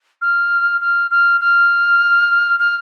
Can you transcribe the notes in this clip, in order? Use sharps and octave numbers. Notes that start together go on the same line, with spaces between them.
F6
F6
F6
F6
F6